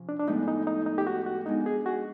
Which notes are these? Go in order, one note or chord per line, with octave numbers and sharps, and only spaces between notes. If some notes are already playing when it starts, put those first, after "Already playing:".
Already playing: C3 F3 C#4
D4
D4
A2 F3 G#3 B3 D#4
D#4
D#4
D#4
G4
F#4
F#4
G#3 B3 D4 D#4
G#4
F#4